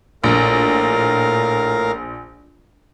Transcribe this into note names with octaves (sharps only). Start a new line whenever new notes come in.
A#1 A2 A#4 F5